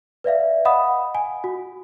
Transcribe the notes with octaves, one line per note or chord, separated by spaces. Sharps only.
B4 D5 E5 F5
D#5 F5 F#5 B5 D#6
G#5
F#4